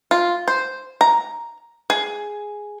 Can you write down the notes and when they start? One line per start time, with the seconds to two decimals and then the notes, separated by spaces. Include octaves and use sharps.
0.11 F4
0.48 C5
1.01 A#5
1.90 G#4